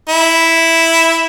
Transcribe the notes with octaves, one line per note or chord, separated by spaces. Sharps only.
E4